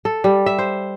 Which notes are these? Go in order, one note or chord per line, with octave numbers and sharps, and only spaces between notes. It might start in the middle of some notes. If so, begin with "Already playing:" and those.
A4
G3
E5
C5